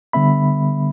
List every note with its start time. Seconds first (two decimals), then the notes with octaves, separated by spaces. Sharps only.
0.13 D3 G3 B3 E5 B5